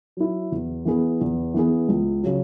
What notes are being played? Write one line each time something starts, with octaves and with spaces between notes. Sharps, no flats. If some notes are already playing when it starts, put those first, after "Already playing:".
F#3 E4
E2
E3 B3 G#4
E2
E3 B3 G#4
C#2
C#3 F#3